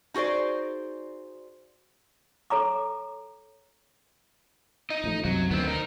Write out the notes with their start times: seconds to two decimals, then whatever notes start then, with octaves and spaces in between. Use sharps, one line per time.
0.14 D#4 F#4 G#4 C5 D5
2.50 A4 C#5 A#5 D6
4.90 D#4 D#5
5.04 A1 F3 A3
5.25 C2 F#2 C3 F#3
5.51 D2 D3 D#3 B3 C4
5.67 D#4 A#4